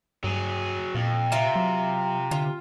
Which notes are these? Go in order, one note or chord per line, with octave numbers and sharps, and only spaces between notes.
G2 F#3 G#4
F2 A#2
C3 F4 E5 A#5
F#3
D3 F4